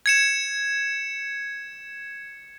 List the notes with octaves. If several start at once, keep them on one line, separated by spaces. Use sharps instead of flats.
G#6 C#7 E7